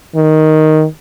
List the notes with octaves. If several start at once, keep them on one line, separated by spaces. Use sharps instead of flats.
D#3